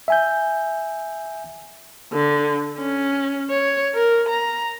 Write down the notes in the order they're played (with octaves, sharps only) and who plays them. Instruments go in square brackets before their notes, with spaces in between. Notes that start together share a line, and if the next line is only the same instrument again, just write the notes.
[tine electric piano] E5 G#5 G6
[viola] D3
C#4
C#5
A#4
A#5